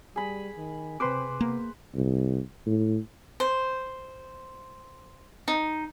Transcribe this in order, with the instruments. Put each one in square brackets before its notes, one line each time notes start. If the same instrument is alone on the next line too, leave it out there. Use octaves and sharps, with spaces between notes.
[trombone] G3 [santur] G#4 B5
[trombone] D#3
[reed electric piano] C3 C6 D6 [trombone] C4 [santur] B4 C5
[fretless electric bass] A#3 [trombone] B3
[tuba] C2
A2
[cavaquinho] C5
D#4